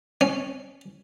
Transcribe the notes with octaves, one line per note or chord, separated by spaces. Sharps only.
C#4